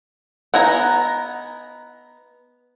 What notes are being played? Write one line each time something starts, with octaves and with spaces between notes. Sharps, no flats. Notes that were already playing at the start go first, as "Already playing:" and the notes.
B3 D#4 G#5 A#5